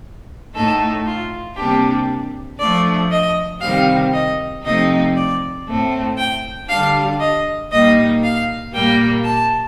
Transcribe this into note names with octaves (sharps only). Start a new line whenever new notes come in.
A2 A3 D#4 A4
F4
C3 G3 A#3 D4 G4
F3 A3 D4 D5
D#5
C3 D#3 G3 C4 F5
D#5
C3 F3 A3 C4 D#4 D#5
D5
A2 A3 C4
G5
D3 G3 D4 F5
D#5
A#2 G3 A#3 D#4 D#5
F5
A#2 G3 A#3 G5
A5